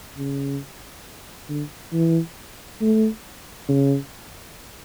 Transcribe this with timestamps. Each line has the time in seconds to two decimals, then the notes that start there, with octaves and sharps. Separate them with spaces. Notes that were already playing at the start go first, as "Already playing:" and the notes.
0.17 C#3
1.49 D3
1.93 E3
2.81 A3
3.69 C#3